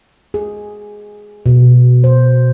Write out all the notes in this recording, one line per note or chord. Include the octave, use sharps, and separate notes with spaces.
G#4
B2
C5